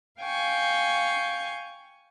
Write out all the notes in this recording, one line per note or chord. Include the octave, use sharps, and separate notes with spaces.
F5 G5 G#5 C#6